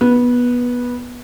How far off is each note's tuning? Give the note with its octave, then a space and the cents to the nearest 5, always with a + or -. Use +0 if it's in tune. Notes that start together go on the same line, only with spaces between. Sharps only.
B3 -15